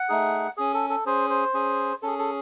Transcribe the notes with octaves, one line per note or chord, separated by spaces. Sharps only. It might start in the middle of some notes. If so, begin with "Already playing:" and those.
Already playing: F#5
A3 D#4 G#4
C#4 G#4
A4
A4
C#4 G#4 C5
C5
C#4 G#4
C#4 G#4 A4
A4